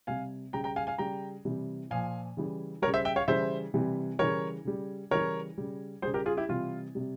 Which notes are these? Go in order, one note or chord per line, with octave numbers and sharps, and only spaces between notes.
C3 G3 F5 G#5
C#3 G3 G5 A#5
G5 A#5
F5 G#5
F5 G#5
C#3 G3 G5 A#5
C3 E3 G3
A#2 F3 F5 G#5
C#3 E3 G3
C#3 G3 A#4 C#5
C5 E5
E5 G5
C#5 F5
C#3 E3 G3 C5 E5
C3 E3 G3
C#3 E3 G3 A#4 C#5
C#3 G3
C#3 E3 G3 A#4 C#5
C#3 G3
C#3 G3 G#4 C5
G4 A#4
F4 G#4
E4 G4
C3 E3 G3 F4
C3 G3